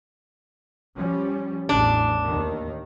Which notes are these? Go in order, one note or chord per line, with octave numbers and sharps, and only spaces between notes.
F3 G3 C#4
A1 E2 D4
D#2 D#3